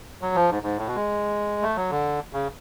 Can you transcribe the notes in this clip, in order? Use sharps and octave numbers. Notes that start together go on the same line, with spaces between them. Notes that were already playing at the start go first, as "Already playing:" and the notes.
F#3
F3
G#2
G#2
A2
B2
G#3
A3
F#3
D3
C#3